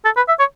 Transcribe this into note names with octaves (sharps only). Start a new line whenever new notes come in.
A4
B4
E5
C#5